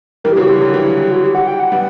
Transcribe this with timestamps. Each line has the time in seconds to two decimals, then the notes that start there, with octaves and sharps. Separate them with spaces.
0.24 E3 G3 A#4
0.33 G4
0.37 C#3 E3 F#4
0.47 D3 G4
0.61 D3 F#3
0.74 E3 G3
1.11 F#4
1.23 G4
1.35 F#5
1.47 G5
1.60 F#5
1.72 G3 B3 F#5